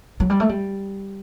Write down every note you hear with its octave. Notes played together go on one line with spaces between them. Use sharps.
F#3
G3
A3
G3